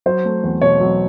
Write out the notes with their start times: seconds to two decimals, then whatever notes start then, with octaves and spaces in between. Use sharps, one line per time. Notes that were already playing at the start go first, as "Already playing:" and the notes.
0.06 F#3 C5
0.25 A3
0.44 E2
0.62 B2 C#5
0.80 F#3